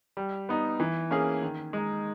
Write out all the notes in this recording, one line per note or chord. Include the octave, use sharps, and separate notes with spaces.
G3
B3 D#4
E3
A#3 C#4 G#4
D#3
G#3 D#4